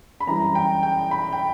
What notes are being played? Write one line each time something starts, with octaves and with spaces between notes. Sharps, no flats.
B5
F#2 E3 G3 A#5
G5
G5
B5
G5